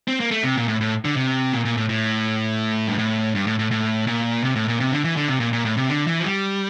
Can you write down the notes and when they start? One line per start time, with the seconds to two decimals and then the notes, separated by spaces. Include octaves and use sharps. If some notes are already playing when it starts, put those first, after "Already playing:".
0.08 C4
0.20 A#3
0.31 A3
0.43 C3
0.56 A#2
0.68 A2
0.81 A2
1.05 D3
1.16 C3
1.53 A#2
1.65 A#2
1.77 A2
1.89 A2
2.88 G2
2.98 A2
3.35 G2
3.47 A2
3.59 A2
3.71 A2
4.07 A#2
4.44 C3
4.55 A2
4.68 A#2
4.80 C3
4.92 D3
5.04 E3
5.16 D3
5.28 C3
5.40 A#2
5.53 A#2
5.65 A2
5.77 C3
5.89 D3
6.07 E3
6.19 F3
6.25 G3